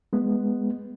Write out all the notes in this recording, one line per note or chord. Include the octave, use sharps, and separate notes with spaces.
G#3 B3